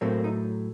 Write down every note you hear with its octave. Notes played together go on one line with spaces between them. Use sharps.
A2 F#3 A3 A#3 C4
D#4